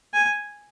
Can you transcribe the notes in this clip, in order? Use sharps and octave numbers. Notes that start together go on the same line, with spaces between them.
G#5